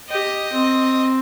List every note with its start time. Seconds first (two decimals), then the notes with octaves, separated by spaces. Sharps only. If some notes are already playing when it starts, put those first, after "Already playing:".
0.10 G4 D#5
0.53 C4